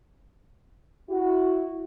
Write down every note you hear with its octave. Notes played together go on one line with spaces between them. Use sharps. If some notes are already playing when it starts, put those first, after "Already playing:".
E4 F#4